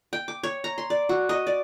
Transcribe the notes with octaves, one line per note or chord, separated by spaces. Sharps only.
G5
D6
C#5
A#5
C6
D5
F#4
D#5
D5